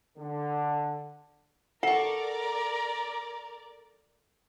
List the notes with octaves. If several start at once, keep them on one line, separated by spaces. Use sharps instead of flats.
D3
A4 A#4 D5 F#5 A#5 C#6